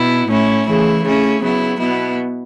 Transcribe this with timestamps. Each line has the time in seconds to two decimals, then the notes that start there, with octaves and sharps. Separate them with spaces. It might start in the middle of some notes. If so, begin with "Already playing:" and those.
Already playing: B2 B3 E4
0.27 A2 A3 C#4 E4
0.66 C#3 E3 A3 E4
1.03 C#3 A3 C#4 E4
1.41 C#3 F#3 B3 E4
1.79 B2 B3 E4